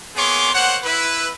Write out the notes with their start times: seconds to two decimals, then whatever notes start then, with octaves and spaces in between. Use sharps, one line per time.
0.16 A#3 B3 G#4 C#5 C6 D6
0.53 A#3 C5 C#5 F#5
0.83 E4 B4